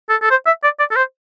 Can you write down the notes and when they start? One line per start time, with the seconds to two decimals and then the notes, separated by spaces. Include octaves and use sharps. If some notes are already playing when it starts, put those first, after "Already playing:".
0.09 A4
0.22 A4
0.31 C5
0.46 E5
0.63 D5
0.79 D5
0.91 A4
0.96 C5